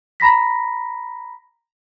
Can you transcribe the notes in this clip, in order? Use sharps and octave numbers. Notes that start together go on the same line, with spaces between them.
A#5 B5 A#6 B6